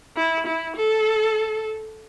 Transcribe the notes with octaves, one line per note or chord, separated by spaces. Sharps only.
E4
E4
A4